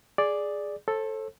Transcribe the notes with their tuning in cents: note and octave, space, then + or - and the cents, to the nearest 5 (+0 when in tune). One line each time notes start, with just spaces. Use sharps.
G#4 +0 D5 +0
A4 +0 C5 +45